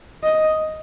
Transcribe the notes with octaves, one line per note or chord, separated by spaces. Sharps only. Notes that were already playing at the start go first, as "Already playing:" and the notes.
D#5